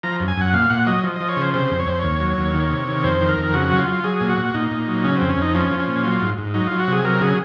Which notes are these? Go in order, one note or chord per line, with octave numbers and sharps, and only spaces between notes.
F3 A#5
F#2
G#5
F#2 F#5
A#2 F5
A#2 F#5
F#3 D#5
F3
F3 D#5
C#5
C#3 C5
C3 C5
F2
C#5
F2 C5
D#2 C#5
F#3
D#2
D#3
C3
D#3
F2 C5
D#3
A#4
F2
C#3 F#4
F#3
F4
F#3
F#3 G#4
A#2
F#4
A#2
A#2 D#4
A#2
F#3
C#3 C#4
F2 C4
C#4
F2 D#4
F3 C#4
F3
C#4
A#2
F#3 F4
G#2
G#2
F#3 D#4
F#3 F4
F#4
C3 G#4
F#3 A#4
C#3 G#4